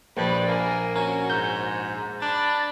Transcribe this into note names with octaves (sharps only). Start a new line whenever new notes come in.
A#1 G2 B4 D5
A#3 A#4 G#5
C#4 F#4 A#4
G#2 G6
D4 B5 A6